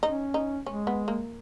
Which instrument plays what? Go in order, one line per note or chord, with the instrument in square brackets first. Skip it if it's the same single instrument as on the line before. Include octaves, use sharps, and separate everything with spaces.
[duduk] C#4 [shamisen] D#4
[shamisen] D#4
[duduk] G#3 [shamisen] C#4
[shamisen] B3
A#3